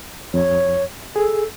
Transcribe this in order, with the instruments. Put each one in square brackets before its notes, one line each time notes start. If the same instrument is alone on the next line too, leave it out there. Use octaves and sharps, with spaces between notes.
[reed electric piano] F2 [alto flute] C#5
[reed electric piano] G#4 [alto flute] A4